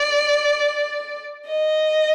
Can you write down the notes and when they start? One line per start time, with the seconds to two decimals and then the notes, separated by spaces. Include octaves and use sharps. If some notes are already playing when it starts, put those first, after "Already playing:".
Already playing: D5
1.47 D#5